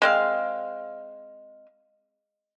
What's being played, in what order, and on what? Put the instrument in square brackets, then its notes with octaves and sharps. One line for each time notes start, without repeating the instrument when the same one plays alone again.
[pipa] G#3 C4 F5